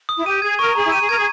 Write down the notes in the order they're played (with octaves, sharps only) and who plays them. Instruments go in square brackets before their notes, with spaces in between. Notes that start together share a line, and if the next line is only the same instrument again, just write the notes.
[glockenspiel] D#6
[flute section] E4
[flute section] G4 [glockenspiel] D#7
[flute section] G#4 [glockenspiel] G#6
[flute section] A#4 [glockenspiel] C#6
[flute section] G#4 [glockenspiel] A#5
[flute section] E4
[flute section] G4 [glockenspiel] D#7
[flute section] G#4
[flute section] A#4 [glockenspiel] G#6
[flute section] G#4